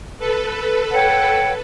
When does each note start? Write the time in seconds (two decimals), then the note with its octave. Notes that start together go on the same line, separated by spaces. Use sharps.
0.19 A4 B4
0.91 C#5 F#5 G5